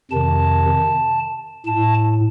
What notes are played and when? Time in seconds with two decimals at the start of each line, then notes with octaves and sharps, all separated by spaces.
0.11 F2 C3 D#3 A5
1.66 A2 A5